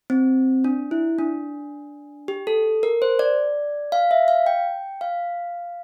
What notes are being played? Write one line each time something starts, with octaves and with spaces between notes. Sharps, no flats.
C4
D4
E4
D4
G4
A4
A#4
C5
D5
F5
E5
F5
G5
F5